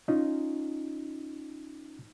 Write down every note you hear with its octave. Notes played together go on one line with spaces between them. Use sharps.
C#4 D#4 F4